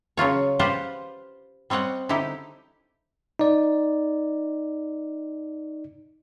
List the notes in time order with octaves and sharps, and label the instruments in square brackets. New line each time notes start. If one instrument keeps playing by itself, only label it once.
[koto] C#3 F#3 F4 C#5
F4 G4 B4 C5 F5 F#5
G3 C4 C#5 D#5 F#5
D3 D#4 E4 G4
[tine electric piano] D#4 D5